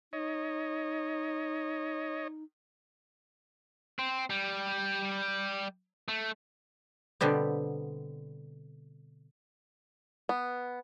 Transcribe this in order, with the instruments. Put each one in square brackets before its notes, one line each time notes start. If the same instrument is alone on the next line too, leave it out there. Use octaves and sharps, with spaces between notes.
[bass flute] D#4 [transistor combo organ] C#5 D#5
[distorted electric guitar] C4
G3
A3
[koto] B2 D3 G3 B3 C4
[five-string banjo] B3